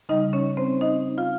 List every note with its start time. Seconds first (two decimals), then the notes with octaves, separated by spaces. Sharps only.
0.09 C#3 G3 D#4 D#5
0.33 C#4 C#5
0.57 C4 C5
0.81 D#4 D#5
1.18 F4 F5